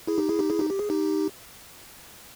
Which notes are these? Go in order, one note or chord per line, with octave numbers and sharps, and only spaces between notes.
E4 G#4
D#4 G4
E4 G#4
D#4 G4
E4 G#4
D#4 G4
G4
G#4
D#4 G4